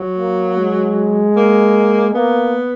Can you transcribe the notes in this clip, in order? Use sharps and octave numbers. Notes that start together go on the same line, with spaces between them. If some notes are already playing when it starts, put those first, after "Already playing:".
Already playing: F#3
A#3
G#3
A#3
A#3 B3